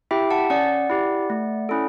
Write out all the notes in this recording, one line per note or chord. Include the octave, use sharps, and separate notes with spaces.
E4 G4 E5 G5
F#5 A5
C#4 D5 F#5
E4 G4
A3
C#4 E4 A4